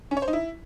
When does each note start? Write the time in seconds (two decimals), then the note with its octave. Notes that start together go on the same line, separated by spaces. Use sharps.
0.11 C#4
0.17 C#5
0.22 C5
0.28 D#4
0.33 E4